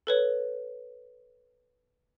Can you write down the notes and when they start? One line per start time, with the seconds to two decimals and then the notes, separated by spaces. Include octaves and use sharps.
0.07 A4 B4 C#5